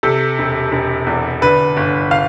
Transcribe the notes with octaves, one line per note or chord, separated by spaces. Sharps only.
C3 A4
E1
E1
E2
D3 B4
G1
F5